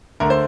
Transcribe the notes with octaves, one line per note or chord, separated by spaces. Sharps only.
D2 D3 A3 A#4
C5